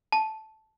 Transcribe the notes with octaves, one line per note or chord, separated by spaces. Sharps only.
A5